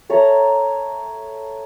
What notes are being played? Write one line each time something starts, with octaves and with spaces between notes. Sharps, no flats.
A4 C#5 E5 A#5